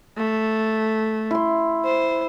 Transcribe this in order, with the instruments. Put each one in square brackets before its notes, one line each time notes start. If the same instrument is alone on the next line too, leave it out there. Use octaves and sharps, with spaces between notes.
[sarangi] A3
[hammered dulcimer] E4 C6
[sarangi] C5